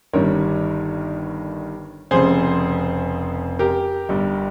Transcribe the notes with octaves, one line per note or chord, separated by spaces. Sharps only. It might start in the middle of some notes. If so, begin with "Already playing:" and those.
G1 G2 D#3 G3 A#4 C#5
F1 F2 C#3 G#4 C5
G4 A#4
G1 G2 G3